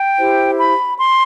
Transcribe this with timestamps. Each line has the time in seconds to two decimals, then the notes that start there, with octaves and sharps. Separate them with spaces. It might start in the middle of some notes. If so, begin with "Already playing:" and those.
Already playing: G5
0.19 E4 G4 C5
0.58 B5
0.97 C6